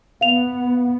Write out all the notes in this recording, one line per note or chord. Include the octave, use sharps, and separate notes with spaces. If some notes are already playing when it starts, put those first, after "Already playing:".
B3 F5 F7